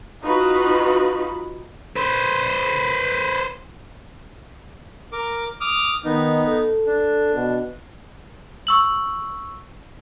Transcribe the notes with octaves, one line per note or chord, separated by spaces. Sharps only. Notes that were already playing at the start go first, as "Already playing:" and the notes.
D#4 F4 F#4 B4 B5
B4 C5
A#4 D6
D6 D#6 F6
D#3 B3 D#4
A4
D4
B2
C#6 E6 F#7